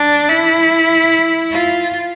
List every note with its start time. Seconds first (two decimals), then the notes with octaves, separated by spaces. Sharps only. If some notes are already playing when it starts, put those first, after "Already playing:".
Already playing: D4
0.29 E4
1.52 F4